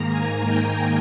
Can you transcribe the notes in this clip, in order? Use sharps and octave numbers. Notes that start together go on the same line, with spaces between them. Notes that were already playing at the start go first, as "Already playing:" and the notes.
Already playing: G#2 D#3 A#3 A#5
G#5
G5